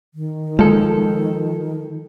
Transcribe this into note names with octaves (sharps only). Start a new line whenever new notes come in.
D#3
F3 G#3 A4